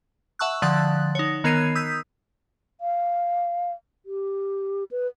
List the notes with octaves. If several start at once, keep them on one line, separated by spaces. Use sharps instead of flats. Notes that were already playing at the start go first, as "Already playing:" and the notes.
E5 F#5 A5 C#6 E6 F#6
D3 F3 F#5 D#6 F#6 A6
D#4 C#5
D#3 B3 A#4 G#6 C7 D#7
D#6 E6 G6 B6
F5
G4
B4